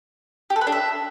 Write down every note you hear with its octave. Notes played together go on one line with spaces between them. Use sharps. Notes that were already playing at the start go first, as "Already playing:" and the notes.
G4
A4
B4
D4
E5